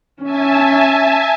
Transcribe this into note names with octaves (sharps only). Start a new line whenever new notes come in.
C#4 E5 G#5 A5